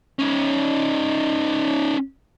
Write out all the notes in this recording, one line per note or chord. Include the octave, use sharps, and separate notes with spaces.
C#4 D#4